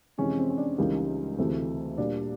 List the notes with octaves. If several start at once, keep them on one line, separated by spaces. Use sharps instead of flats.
F2 C3 E3 G#3 C#4
C4
C#4
D4
C#2 C#3 E3 G3 A#3 D#4
D2 C3 E3 A3
A#2 G3 A#3 D4